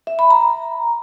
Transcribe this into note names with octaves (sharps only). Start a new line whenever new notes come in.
E5
B5
A#5